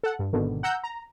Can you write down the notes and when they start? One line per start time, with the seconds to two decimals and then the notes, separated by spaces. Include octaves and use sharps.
0.04 A4 F#5
0.19 G2
0.33 G#1 B2 D3 D#3
0.63 F#5 A#5 E6 G6
0.84 A#5